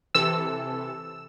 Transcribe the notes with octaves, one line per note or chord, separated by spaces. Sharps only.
C3 E3 A4 E6